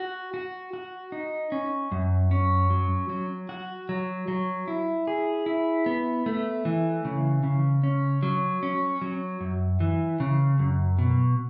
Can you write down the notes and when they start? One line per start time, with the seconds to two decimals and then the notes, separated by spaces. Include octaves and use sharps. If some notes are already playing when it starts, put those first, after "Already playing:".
Already playing: F#4
0.34 F#4
0.73 F#4
1.12 D#4
1.52 C#4
1.92 F#2
2.31 C#4
2.70 F#3
3.10 F#3
3.49 F#4
3.89 F#3
4.28 F#3
4.68 E4
5.07 G#4
5.46 E4
5.86 B3
6.26 A3
6.65 E3
7.05 C#3
7.43 C#3
7.83 C#4
8.23 F#3
8.63 C#4
9.01 F#3
9.41 F#2
9.80 E3
10.20 C#3
10.59 F#2
10.99 B2